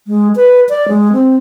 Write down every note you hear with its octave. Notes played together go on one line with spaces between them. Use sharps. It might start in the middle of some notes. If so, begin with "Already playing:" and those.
G#3
B4
D5
G#3
C4